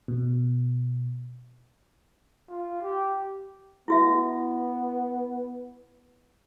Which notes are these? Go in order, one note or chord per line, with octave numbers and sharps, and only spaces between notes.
B2
F4
G4
B3 E4 F#4 E5